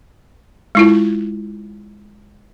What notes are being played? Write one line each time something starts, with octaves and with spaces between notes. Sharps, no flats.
G#3 E4 F4